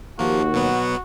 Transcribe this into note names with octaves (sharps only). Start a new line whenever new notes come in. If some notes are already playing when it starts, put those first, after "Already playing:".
D#2 F3 A#3 F#4
B2 F#3 B3